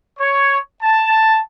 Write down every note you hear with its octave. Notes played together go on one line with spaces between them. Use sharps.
C#5
A5